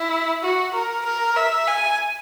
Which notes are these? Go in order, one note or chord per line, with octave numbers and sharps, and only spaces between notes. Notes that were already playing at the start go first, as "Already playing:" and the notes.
Already playing: E4
F#4
A#4
A#4
E5
G#5